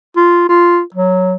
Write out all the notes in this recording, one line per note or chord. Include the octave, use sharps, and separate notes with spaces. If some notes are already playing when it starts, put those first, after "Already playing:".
F4
F4
F#3